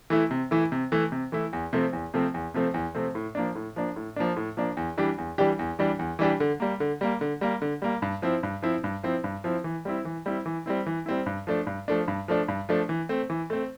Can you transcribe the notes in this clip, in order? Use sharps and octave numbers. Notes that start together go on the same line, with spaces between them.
E3 A3 E4
C3
E3 A3 E4
C3
E3 A3 E4
C3
E3 A3 E4
E2
C3 F3 A3 C4
E2
C3 F3 A3 C4
E2
C3 F3 A3 C4
E2
C3 F3 A3 C4
A2
F3 A#3 D4
A2
F3 A#3 D4
A2
F3 A#3 D4
A2
F3 A#3 D4
E2
E3 G3 D4 G4
E2
E3 G3 D4 G4
E2
E3 G3 D4 G4
E2
E3 G3 D4 G4
D3
G3 A#3
D3
G3 A#3
D3
G3 A#3
D3
G3 A#3
G2
F3 C4 E4
G2
F3 C4 E4
G2
F3 C4 E4
G2
F3 C4 E4
E3
G3 C4 E4
E3
G3 C4 E4
E3
G3 C4 E4
E3
G3 C4 E4
G2
F3 A3 D4
G2
F3 A3 D4
G2
F3 A3 D4
G2
F3 A3 D4
E3
A3 C4
E3
A3 C4